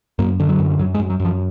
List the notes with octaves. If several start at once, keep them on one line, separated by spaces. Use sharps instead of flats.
F#2 A#3
D3
F#3
F#2
F#2 F#3
G#3
F#2
F#3
F#2 F3